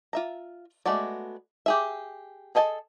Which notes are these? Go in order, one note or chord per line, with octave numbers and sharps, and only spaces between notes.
F4 E5 A#5
G#3 A3 B3 F#4 D5
G4 G#4 E5
G#4 A4 D#5 G#5 A5